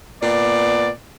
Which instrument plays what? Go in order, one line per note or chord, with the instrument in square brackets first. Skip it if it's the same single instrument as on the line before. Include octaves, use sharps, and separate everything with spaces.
[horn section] A#2 B3 D5